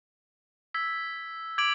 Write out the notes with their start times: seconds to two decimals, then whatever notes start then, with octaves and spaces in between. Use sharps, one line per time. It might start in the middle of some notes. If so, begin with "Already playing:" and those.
0.74 E6 G#6 B6
1.58 D6 G#6 D7 F#7